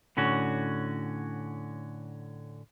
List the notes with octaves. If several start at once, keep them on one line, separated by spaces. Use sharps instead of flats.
A2 D3 C#4 F#4